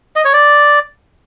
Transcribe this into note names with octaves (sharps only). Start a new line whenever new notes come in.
D#5
C#5
D5